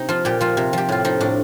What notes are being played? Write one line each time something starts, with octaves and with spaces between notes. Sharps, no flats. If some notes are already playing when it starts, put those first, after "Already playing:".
Already playing: C3 D#4
F3 F4
A#2 G4
F3 F4
C3
F3 G4
A2 F4
F3 D#4
A2 D4